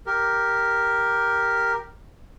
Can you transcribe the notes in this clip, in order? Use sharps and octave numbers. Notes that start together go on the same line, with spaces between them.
G4 A#4